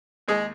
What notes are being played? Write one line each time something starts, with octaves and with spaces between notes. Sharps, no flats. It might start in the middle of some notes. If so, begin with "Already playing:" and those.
D#2 G#3 G#4